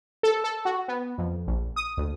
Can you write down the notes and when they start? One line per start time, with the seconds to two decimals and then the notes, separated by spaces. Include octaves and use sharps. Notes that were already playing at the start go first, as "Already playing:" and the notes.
0.23 A4
0.44 A4
0.65 F#4
0.88 B3
1.18 F2
1.47 A#1
1.76 D#6
1.97 D2